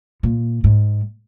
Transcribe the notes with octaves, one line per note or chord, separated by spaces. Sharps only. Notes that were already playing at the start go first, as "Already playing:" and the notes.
A#2
G#2